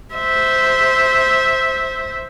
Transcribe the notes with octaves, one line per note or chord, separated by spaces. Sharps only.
C5 E5